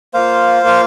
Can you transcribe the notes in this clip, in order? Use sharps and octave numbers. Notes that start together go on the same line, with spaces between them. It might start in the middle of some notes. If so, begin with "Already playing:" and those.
A#3 F4 C5 F5
A#3 F4